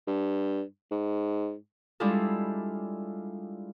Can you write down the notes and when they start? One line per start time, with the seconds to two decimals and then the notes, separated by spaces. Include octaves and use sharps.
0.07 G2
0.91 G#2
2.00 G3 G#3 D4 E4 F4 A4